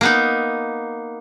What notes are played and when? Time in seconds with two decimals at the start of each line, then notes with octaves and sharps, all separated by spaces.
0.01 A#3 B3 D#4